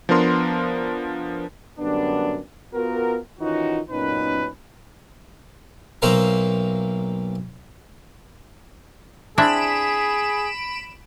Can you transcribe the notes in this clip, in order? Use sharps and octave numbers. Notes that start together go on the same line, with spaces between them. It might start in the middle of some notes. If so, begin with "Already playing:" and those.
F3 B3 D4 A#4 C6
F#2 D3 G3 B3 D4
B3 F4 F#4 A#4
D#3 E3 C#4 D#4 F4 F#4
F#2 A#2 B3 C#4 D#4 B4
B1 A#3 C5 E5 F5 A#5
C4 D4 E4 G#4 B5 D7 E7